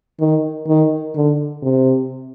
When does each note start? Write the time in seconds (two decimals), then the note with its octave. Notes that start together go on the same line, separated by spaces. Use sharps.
0.20 D#3
0.67 D#3
1.15 D3
1.62 C3